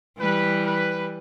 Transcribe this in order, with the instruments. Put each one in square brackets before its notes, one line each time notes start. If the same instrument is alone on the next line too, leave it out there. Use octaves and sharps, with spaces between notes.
[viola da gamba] E3 G3 [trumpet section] B4
[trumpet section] B4